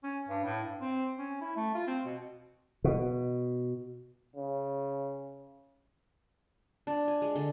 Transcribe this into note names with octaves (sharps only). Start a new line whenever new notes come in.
C#4
G2
A2
G2
C4
C#4
E4
A3
F4
C4
B2
B2
C#3
D4
G#5
G#3
D3